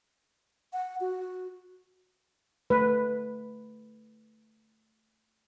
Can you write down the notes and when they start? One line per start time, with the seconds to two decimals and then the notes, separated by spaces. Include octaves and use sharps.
0.73 F#5
1.01 F#4
2.70 A3 B4